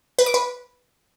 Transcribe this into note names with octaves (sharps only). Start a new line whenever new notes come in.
B4
D6
B4